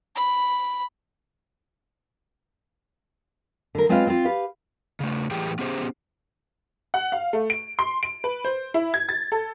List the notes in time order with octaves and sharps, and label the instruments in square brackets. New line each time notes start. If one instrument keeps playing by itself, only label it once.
[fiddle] B5
[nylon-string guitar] D3 A#4
G#3 C4 F4 B4 C#5 F5
C4 F4
G4 B4 F5
[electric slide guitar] C#3 A3
A2 E3 G4 G#4 G5
B3 C#4 G4 G#4 C5
[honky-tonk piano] F#5
F5
A3
D7
C6
D7
B4
C5
E4
G#6
A6
A4